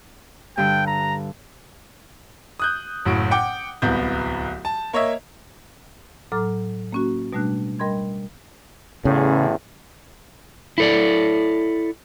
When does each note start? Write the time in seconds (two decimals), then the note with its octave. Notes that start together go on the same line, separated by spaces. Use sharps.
0.58 G2 D3 G5
0.87 A#5
2.60 D#6 F#6 G6
3.05 F#1 A2 F#4 D7
3.31 F#5 G5 D6
3.82 D1 C2 B3 G6
4.65 A5
4.93 A#3 C#5 D#5 E5
6.32 A2 F#3 A4 A#5 D6 F6
6.92 A#3 C#4 F#4
7.33 B2 G3 A3 D4 F#6
7.79 G3 A#4 D#5 B5 C6 G#6
9.05 A1 E2 A2 C#3
10.78 E4 A4 D5